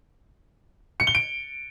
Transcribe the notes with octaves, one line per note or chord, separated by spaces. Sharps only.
C#7
G7
D7